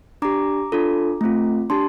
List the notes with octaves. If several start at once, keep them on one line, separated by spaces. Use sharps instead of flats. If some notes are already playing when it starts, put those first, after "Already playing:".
D4 G4 A#5 D6
D4 F4 A4
A3 C4 F4
D4 G4 A5 C6